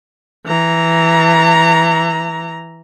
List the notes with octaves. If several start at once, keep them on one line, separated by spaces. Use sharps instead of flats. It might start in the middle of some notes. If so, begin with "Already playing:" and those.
E3 A#5